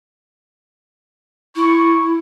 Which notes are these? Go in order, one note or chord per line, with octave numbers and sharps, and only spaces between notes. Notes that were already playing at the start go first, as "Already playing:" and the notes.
E4 C#6